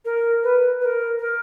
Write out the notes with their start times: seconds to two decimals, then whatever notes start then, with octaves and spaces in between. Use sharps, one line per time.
0.05 A#4
0.43 B4
0.81 B4
0.85 A#4
1.19 A#4